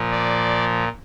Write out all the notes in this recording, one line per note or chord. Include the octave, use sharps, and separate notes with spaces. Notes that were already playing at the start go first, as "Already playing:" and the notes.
Already playing: A#2 F3
D5